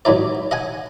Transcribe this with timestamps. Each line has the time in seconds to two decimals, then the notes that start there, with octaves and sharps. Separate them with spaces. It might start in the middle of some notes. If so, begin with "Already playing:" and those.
0.05 D#2 G#2 F#3 D#4 D5
0.51 D#5 F#5 G#5